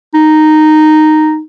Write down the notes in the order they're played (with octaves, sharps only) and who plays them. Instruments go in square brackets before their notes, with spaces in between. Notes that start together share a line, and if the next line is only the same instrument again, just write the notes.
[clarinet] D#4